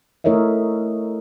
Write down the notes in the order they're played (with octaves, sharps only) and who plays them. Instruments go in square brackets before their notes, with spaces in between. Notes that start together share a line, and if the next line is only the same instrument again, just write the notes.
[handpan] A3 E4 A#4 C#5 D#5 E5